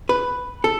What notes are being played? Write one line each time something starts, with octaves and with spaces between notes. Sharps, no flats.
B4
A4